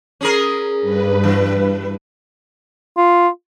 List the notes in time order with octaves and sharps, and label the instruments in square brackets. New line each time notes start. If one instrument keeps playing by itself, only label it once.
[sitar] C#4 G#4 A#4
[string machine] G2 B4
[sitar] E3
[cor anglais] F4